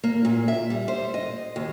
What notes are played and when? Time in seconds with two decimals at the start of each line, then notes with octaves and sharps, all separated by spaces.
0.04 A#3
0.25 A#2
0.48 E5
0.70 G3
0.88 C5
1.14 D#5
1.56 D#2